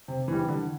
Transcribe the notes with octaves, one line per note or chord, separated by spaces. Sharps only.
C3
E3 G3
D3